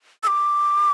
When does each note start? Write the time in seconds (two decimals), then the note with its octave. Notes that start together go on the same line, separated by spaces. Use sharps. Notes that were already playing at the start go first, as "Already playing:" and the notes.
0.23 E6
0.27 D6